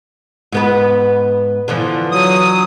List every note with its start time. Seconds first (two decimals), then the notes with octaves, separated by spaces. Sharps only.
0.52 G#2 B3 B4
1.68 D3 E3 F3
2.12 F#3 D#6